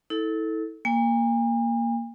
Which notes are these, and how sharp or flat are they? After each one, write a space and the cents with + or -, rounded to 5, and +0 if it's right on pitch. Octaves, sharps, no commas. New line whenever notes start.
E4 -35 A4 +0
A#3 +0 G#5 -45